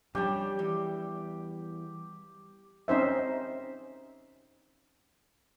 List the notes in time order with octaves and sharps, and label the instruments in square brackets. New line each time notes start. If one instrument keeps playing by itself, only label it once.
[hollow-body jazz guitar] F2 C#4 D4 [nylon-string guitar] G3 [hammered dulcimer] G4
[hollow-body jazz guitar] E2
[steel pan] C4 C#4 D#4 C5 E5